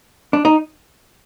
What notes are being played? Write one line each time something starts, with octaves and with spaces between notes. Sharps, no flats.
D4
D#4